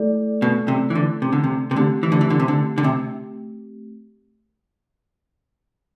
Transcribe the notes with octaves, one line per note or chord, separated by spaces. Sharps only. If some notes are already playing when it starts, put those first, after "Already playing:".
Already playing: A3 E4 A4 D5
B2
C3
E3
D3
C3
D3
C3
C3
D3 A3 C4 G4
E3
D3
E3
D3
C3
D3
D3
C3